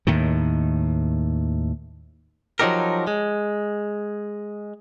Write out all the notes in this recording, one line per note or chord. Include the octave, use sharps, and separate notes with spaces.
D#2 A2 D#3
F3 F#3 A3 D#4 G4 A#4
G#3